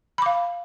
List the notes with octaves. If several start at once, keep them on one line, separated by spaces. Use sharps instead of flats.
F5 B5 D6